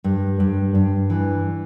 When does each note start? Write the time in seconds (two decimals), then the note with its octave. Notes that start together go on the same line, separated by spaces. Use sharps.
0.04 G2
0.40 G2
0.75 G2
1.10 E3